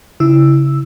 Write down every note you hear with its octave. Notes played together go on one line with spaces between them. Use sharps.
C#3 E4 E6